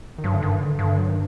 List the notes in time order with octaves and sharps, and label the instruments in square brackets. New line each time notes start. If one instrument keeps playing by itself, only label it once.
[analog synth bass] D#3
[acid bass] G2 [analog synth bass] F#3
[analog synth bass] D3
[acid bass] G2 [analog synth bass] D#3
[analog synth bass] D3
[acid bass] G2 [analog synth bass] D3
[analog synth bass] F#3
D#3